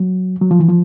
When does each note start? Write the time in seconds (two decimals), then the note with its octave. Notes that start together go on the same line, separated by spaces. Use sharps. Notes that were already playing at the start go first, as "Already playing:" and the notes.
Already playing: F#3
0.41 F#3
0.51 F3
0.60 E3
0.68 F3